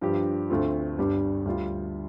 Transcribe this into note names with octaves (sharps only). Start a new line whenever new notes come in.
G2 F3 D4 G4
D2 D3 A3 C4 F4
G1 G2 G3 D4 G4
D2 D3 G3 F4